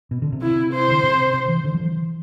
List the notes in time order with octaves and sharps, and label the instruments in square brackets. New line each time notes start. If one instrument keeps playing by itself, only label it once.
[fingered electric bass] B2
D3
C3
[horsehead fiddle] E4
C5
[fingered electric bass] D3
C3
C3
E3
D3
F3
E3